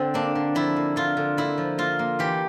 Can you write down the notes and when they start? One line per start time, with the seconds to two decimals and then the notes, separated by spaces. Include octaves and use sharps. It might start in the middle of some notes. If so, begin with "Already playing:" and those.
Already playing: D3 C4
0.14 A#3 D4
0.35 D3
0.55 F3 E4
0.76 A#3
0.96 D3 F4
1.17 D3
1.37 A#3 E4
1.58 F3
1.78 A#3 F4
1.99 A#3
2.19 E3 G4